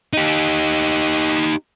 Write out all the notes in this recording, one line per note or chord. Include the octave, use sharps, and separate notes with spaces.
D#4 G4